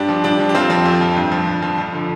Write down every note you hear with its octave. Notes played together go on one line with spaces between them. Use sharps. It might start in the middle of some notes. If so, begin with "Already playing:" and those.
Already playing: G2 D4 G4
F3
G2 D4 G4
F3
G4
F2 C4 F4
F3 C4
F2
F3
G2
F3
G2
F3
F2
D3 F3